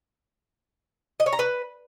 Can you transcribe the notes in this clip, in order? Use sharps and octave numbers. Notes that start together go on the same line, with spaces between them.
D#5
C#5
A#5
B4